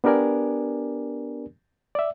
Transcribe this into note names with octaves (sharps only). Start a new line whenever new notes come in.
B3 D4 G4 A#4 D5 G#5
D5 E5